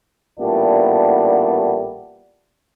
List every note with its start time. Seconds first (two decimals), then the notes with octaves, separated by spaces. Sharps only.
0.39 A1 A#2 G3 A3 B3 D4